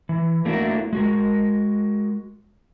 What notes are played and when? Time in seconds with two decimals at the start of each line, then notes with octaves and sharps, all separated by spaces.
0.09 E3
0.45 A3 A#3 D4 E4 F#4 A#4
0.93 G#3 F#4 A#4